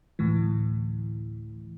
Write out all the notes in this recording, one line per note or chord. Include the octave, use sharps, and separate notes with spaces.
D2 A2 E3